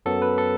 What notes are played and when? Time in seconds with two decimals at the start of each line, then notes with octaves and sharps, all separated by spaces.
0.06 F#2 F#3 B3 A4
0.22 B4
0.38 A4